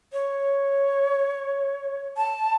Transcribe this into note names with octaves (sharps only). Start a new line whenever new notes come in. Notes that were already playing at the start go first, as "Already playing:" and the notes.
C#5
A5